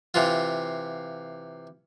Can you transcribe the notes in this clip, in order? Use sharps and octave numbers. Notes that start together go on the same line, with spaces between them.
C3 E3 F4